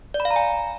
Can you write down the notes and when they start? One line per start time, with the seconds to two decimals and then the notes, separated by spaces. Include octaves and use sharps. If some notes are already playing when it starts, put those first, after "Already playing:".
0.14 D5
0.20 B5
0.25 F5
0.31 A#5
0.36 G#5